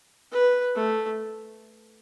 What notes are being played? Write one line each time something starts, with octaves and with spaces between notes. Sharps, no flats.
B4
A3